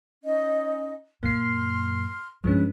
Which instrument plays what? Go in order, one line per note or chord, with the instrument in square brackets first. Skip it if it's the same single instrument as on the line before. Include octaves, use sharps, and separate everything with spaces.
[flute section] C#4 D#4 D#5
[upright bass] F#2 A#2 [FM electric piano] A#3 C7 [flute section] C6 F6
[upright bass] G2 D4 [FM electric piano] F3 G#3 C#4 [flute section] B4